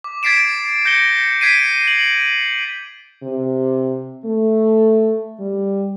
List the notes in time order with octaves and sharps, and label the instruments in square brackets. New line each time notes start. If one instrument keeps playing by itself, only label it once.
[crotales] D6
G#6 A6 B6 C7 D7 E7
G6 A#6 C#7 G7
G#6 B6 C7 D7 D#7
F#7
[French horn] C3
A3
G3